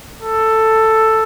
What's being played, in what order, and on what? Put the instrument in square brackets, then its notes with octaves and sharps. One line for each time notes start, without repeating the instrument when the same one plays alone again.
[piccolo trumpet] A4